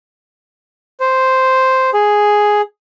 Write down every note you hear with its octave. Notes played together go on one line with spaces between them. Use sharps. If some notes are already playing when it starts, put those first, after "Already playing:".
C5
G#4